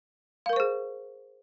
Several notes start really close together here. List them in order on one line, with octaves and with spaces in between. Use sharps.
F5 A#4 C#6 C5 G#4